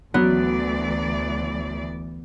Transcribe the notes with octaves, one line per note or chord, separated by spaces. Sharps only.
D2 E3 F#3 B3 D5